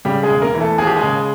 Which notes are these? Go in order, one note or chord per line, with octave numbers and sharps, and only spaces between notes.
C#3 G3 G4
G#3 G#4
E1
A#3 A#4
E3
A3 A4
D#2 G#4
G4
G#3 G#4
C#3